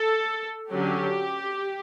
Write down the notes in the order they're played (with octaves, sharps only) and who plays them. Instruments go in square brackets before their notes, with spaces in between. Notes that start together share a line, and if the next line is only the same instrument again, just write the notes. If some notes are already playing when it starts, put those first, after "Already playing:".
Already playing: [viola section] A4
D3 F#3 C#4 G4